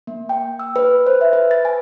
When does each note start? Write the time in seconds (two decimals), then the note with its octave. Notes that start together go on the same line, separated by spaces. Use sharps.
0.07 A#3
0.29 G5
0.59 E6
0.76 B4
1.07 C5
1.21 E5
1.33 B4
1.51 A6
1.65 G#5